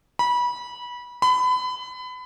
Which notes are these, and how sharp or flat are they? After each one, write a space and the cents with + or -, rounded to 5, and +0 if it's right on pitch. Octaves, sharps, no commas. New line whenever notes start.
B5 -25
B5 +30